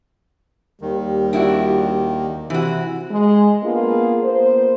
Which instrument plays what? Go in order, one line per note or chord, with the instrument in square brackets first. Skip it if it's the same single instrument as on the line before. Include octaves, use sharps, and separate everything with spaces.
[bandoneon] D#2 D#3 [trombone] G3
[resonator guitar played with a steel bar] D4 E4 F#4
[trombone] C3 [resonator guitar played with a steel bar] E3 F#4
[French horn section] G#3
A#3 B3 D4 F4 G#4
A#3 B3 C5